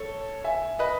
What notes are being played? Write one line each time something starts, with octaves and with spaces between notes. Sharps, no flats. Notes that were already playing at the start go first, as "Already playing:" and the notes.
Already playing: A4 C#5
E5 G#5
B4 D#5